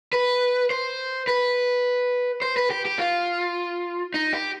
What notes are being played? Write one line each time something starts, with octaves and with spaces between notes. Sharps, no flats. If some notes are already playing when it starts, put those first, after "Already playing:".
B4
C5
B4
C5
B4
G4
G4
F4
D#4
G4